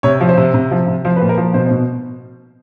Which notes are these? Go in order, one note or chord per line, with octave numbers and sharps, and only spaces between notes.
C3 C#5
F3
C5
C3
C3
F3
C3
F3 C5
B4
A#2
A#4
F3
B2 C5
C5
B2